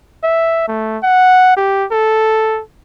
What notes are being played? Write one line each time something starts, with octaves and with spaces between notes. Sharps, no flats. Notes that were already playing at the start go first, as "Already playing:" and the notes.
E5
A3
F#5
G4
A4